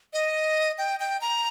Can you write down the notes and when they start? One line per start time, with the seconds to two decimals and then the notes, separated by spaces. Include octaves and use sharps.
0.13 D#5
0.78 G5
1.00 G5
1.21 A#5